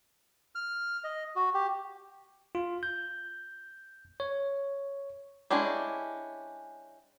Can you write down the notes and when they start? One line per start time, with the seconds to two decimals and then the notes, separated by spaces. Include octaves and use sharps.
0.55 F6
1.04 D#5
1.36 F#4
1.54 G4
2.55 F4
2.83 G6
4.20 C#5
5.50 G#3 C#4 D4 E4 G4